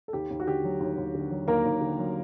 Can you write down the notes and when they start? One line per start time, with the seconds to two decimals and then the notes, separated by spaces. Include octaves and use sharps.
0.08 A4
0.13 D#2 G4
0.30 D#2
0.40 F#4
0.47 D3 G4
0.64 F#3
0.80 D#2
0.97 D#2
1.15 D3
1.31 F#3
1.48 D#2 A#3 A#4
1.65 D#2
1.81 D3
1.99 F#3